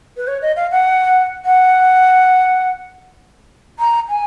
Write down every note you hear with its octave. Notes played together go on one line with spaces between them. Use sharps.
B4
C#5
D#5
F5
F#5
F#5
A#5
G#5